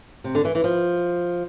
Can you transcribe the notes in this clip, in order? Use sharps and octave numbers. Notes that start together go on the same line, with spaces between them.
C3
D3
E3
E3
F3